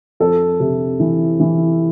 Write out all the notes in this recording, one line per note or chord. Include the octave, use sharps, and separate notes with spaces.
F2 A4
C3
E3
E3